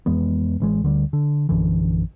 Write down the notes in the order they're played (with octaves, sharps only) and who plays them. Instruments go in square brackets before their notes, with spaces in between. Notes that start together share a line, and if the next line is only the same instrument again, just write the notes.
[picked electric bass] F2 E3 G#3 B3
A1 E3 G#3
D2 D3 F3 G3
D3
A#1 F#2 D3 E3